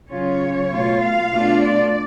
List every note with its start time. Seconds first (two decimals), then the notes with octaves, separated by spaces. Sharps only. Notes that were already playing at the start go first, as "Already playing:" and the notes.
0.11 C#3 F#3 C#4 F4 C#5
0.72 B2 A3 F4
1.02 F5
1.33 B2 A3 D4 F4
1.64 D5